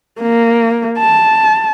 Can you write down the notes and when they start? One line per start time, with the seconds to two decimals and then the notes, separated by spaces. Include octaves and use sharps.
0.21 A#3
0.99 A5